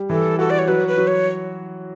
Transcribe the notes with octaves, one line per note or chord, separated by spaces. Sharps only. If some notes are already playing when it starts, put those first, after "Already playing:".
Already playing: G3
E3 A4
F#4 A4
D5
C#5
F#3 B4
B4
F#3
C#5